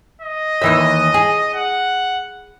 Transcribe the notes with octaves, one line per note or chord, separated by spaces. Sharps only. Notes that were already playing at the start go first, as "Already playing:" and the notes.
D#5
D#2 E3 E5
G#4
F#5